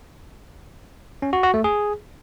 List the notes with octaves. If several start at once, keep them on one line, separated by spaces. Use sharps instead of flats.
C#4
F#4
F#4
A3
G#4